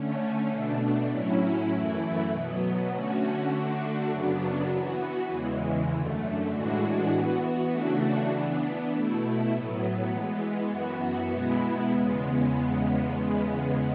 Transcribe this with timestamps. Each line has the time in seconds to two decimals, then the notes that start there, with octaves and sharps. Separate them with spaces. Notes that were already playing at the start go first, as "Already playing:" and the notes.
Already playing: D3 A3 C#4
0.50 B2 A3 D4
1.10 A2 F#3 C#4 E4
1.70 F#2 E3 A3 E4
2.30 B2 F#3 B3
2.90 D3 A3 C#4 F#4
3.50 D3 A3 D4 F#4
4.10 F#2 C#3 F#3 B3 D4
4.70 E3 B3 F#4
5.30 E2 C#3 E3 G#3
5.90 F#2 D3 A3
6.50 A2 E3 G#3 D4 F#4
7.10 E3 B3 F#4
7.70 C#3 E3 A3 D4 F#4
8.30 E3 B3 D4
8.90 B2 A3 E4
9.50 A2 F#3 B3
10.11 E3 G#3 B3
10.70 F#2 E3 B3 F#4
11.31 B2 G#3 B3 E4
11.91 E2 C#3 G#3 B3